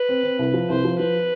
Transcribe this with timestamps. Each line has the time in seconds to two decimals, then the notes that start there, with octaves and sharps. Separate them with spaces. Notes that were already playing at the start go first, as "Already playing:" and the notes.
Already playing: B4
0.09 C4
0.23 C4
0.39 C2
0.54 F3
0.69 C2 C5
0.85 F3
0.99 F3 B4